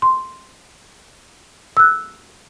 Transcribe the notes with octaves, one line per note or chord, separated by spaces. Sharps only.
C6
E6 F#6